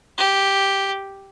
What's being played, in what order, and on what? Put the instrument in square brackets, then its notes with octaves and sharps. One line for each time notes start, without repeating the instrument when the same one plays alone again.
[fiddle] G4